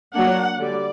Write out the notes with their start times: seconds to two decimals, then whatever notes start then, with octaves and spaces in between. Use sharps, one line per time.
0.14 F#3 A#3 D4 F#5
0.58 D3 G3 D5